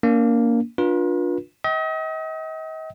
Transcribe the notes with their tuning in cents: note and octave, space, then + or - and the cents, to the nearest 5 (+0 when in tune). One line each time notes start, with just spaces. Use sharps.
A#3 +0 D4 -40
D4 +0 F4 +25 B4 -40
D#5 +40 G5 -35